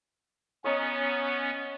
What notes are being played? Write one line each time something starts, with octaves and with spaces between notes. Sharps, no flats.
B3 C#4 C#5 D#5 A#5